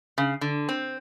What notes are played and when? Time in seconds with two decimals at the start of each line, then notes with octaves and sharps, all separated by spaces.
0.18 C#3
0.41 D3
0.69 C4